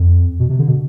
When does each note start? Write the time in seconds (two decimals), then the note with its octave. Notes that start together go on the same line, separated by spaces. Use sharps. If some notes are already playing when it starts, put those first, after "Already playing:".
Already playing: F2
0.39 B2
0.49 C3
0.59 D3
0.68 B2